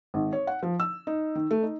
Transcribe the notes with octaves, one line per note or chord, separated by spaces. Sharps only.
G#1
C#5
F#5
F3
E6
D#4
D#3
A3
D#4